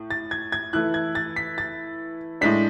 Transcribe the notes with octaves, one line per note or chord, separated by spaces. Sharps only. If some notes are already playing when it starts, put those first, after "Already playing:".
Already playing: A2
A6
G#6
G#6
E3 A3 E4 F#6
G#6
A6
B6
A6
A2 G#3 D4 B6